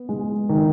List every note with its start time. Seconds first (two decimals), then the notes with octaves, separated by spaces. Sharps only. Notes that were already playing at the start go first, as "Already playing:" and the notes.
Already playing: B3
0.09 G#3
0.49 D#3